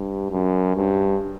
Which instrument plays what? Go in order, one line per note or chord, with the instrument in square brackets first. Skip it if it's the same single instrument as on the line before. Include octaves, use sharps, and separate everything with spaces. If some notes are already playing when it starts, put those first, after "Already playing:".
Already playing: [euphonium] G2
F#2
G2